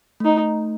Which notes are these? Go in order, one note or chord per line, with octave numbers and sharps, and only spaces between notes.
A3 D#4